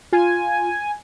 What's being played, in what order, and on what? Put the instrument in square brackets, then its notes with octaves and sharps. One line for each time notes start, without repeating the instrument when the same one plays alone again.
[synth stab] F4 [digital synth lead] G#5